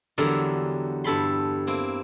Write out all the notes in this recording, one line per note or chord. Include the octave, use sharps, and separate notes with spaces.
E2 D3 F#3 G3 A#4 E5
G2 A4 B5 C6
A#3 C4 E4